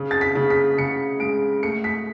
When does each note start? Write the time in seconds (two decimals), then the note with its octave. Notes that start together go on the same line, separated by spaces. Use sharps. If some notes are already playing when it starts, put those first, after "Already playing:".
Already playing: C#3
0.11 A6
0.21 B6
0.35 C#3
0.50 B6
0.78 C#3 C#7
1.20 G#3 D7
1.63 A3 C#7
1.84 B6